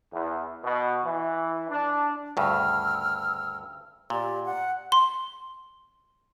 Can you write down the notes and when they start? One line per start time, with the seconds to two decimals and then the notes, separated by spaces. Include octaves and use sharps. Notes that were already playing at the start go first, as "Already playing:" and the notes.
0.13 E2
0.64 B2
1.05 E3
1.70 D4
2.37 D2 G2 C#3 E6 F6
4.10 A#2 G4 D5
4.45 F#5
4.92 C6